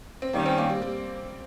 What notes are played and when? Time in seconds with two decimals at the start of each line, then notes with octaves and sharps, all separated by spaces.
0.22 C4
0.33 D#3 G3 A#3 C#4
0.46 C4
0.58 A#3
0.70 G3
0.82 G3